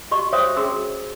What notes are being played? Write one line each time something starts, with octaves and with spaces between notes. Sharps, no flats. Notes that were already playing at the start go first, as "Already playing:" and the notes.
F#4 G4 D#5 C#6
F#4 C5 C#5 E5 G5 D#6
C#4 F#4 G#4 A#5 E6